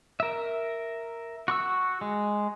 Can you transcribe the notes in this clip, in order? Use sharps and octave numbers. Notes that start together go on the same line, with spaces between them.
A#4 E5
F#4 C#6 E6
G#3